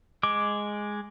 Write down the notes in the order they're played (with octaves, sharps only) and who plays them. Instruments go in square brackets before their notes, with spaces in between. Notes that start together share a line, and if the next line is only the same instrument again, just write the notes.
[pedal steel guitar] G#3 D6